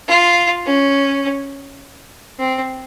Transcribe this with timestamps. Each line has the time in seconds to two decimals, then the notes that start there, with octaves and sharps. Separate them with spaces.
0.08 F4
0.66 C#4
2.39 C4